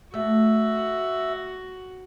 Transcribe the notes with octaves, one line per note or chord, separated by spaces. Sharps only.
A3 F#4 E5 E6